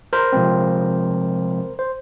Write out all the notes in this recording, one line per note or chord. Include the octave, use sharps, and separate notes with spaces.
A#4 C5
C3 F3 G#3 C4
C5